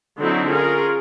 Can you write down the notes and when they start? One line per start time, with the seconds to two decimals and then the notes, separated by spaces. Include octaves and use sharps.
0.18 D3 F#3 C4 D#4 E4
0.49 C#4 F4 G#4 A#4